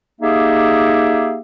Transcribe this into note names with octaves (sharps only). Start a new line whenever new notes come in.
A#3 D#4 G4 G#4 E5